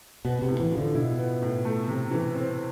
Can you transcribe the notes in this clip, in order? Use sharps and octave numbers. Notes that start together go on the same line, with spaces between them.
B2 B3
C3
A2
E3
F3
D3
B2 E4
B3
A2
A3
C3
E3
C4